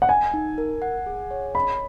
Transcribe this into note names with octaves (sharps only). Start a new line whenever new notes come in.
F#5
D#5 G#5
D#4
A#4
F#5
G#4
C#5
D#5 B5